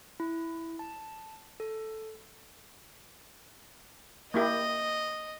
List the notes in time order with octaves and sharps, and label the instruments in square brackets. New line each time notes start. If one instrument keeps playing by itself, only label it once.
[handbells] E4
A5
A4
[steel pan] A#3 E4 G4 [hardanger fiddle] D#5